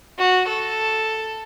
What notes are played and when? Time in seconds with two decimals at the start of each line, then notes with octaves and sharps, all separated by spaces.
0.19 F#4
0.49 A4